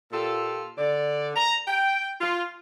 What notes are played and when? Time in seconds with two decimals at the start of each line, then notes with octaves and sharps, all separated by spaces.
0.12 A#2 F4 G4 A4
0.78 D3 D5
1.36 A#5
1.68 G5
2.21 F4